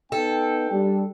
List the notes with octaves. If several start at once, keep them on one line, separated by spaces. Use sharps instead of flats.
B3 D#4 A4 G5
G3 D4